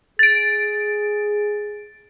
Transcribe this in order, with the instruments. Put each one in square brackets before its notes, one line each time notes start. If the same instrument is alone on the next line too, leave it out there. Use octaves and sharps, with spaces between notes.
[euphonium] G#4 [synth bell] A6 D7